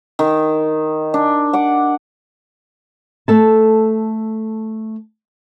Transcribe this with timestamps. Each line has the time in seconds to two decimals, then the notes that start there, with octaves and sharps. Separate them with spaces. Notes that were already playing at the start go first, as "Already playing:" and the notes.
0.19 D#3
1.14 D4
1.53 F#5 D6
3.28 A3 A4 A5